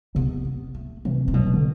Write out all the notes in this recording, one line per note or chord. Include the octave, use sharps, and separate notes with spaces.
C3 B3
B3
A3
C3 E3
C3
B2 F#3
D3